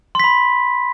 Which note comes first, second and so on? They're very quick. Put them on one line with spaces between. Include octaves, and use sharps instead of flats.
C6 B6 B5